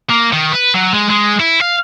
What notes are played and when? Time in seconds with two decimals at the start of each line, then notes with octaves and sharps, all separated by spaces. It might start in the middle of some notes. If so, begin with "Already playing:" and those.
0.10 A#3
0.33 D#3
0.52 B4
0.74 F#3
0.93 G#3
1.10 G#3
1.40 E4
1.61 F5